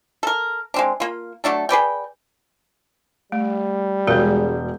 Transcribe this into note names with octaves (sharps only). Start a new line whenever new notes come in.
A4 A#4
G#3 C4 D4
A#3 F4
F#3 A3 D4 A4
G#4 B4 D5 G5
G3 A3
E1 G#3 F#4 G#4 A#4 G6